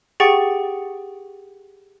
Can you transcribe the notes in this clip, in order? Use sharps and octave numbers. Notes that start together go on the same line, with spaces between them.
G4 G#4 F#5 G5 C#6 A6